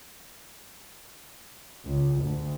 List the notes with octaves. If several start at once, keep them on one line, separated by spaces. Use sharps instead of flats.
C#2
D2